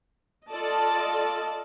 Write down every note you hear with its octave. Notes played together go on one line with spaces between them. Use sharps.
F4 A4 D5 D#5 A5